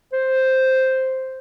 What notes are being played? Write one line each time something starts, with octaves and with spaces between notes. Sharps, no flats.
C5